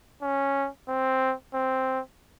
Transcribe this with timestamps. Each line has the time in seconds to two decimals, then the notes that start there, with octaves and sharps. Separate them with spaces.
0.22 C#4
0.89 C4
1.54 C4